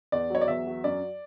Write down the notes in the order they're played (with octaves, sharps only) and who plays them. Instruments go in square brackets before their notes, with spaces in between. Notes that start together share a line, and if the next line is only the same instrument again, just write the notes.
[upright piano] E2 D5
F#3 C#5
D5
E2 E5
F#3
F#2 D5